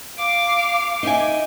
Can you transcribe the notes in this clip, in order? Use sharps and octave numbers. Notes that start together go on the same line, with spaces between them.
F5 D6
D#4 E5 G#5